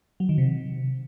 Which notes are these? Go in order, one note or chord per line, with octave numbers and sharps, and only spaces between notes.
F#3
D#3
C3